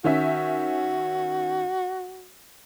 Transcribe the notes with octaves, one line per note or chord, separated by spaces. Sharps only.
D#3 C#4 F#4 E5